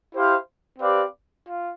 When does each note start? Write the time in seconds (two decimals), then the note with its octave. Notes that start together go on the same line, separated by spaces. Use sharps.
0.13 E4 G4 C5 F5
0.79 C4 G4 B4 D5 F5
1.46 F4